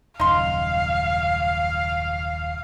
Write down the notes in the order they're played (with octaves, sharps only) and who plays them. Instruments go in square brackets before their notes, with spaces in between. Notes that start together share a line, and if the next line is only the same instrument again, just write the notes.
[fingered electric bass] D#1 F#2 C#3 [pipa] D#4 C6 [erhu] F5